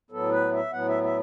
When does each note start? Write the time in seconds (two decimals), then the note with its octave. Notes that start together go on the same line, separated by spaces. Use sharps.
0.11 A2 F#3 B3 A4
0.31 B4
0.52 E5
0.73 A2 F#3 B3 F#5
0.88 E5
1.03 E5